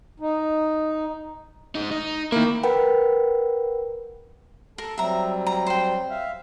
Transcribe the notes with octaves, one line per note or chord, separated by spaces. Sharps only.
D#4
G#2 D#4
D#4
D#3 A#3 E4
A#4 B4 F#5 G5 B5
A4 A#4 A5
F#3 G3 C4 E5 A#5
A#5
C5 G5
E5 F5